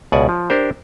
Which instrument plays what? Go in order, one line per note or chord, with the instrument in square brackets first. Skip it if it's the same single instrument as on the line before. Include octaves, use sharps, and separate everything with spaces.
[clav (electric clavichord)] C#2 B2 D5 F#5 G#5
F3
D4 G4 A#4 C5